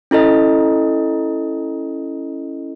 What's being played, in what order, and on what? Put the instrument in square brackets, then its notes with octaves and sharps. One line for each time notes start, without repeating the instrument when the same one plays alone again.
[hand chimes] C#4 E4 A4 D#5